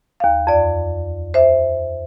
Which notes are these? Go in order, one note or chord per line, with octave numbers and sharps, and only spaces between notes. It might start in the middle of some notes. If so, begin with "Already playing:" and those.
D#2 F5
F2 D5
C5 E5